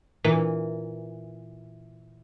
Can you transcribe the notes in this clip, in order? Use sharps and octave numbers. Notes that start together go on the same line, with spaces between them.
A#2 E3